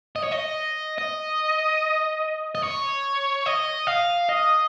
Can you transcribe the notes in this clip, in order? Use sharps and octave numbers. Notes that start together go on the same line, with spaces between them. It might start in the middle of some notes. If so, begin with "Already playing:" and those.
D#5
C#5
D#5
D#5
D#5
C#5
D#5
F5
D#5